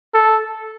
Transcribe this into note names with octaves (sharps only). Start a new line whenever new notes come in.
A4